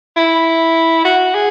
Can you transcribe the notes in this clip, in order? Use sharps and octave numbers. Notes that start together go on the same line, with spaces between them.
E4
F#4
G#4